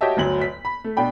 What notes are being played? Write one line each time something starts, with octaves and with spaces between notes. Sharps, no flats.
F#4 G4 C#5 D#5 E5 A5
G1 D2 F#3 F#7
B6
B5
A3
B2 D4 G5 B5